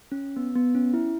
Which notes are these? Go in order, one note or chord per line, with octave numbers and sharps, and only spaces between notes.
C#4
B3
B3
C#4
E4